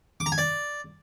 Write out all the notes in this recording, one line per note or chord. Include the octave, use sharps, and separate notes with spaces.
D6
A#5
G#5
D5